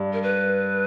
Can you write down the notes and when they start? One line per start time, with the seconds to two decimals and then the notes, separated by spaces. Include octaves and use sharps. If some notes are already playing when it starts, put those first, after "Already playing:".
Already playing: G2
0.13 A#4
0.23 B4